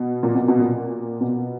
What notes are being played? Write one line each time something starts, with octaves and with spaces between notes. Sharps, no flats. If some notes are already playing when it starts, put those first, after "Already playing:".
Already playing: B2
A#2
B2
B2
A#2
B2